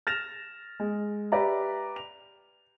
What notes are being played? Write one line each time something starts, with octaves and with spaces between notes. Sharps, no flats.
F6 A6 A#6 E7 F7
G#3
G4 B4 D5 E5 A#5
F7